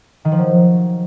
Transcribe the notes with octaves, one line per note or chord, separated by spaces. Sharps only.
D#3
F3
F#3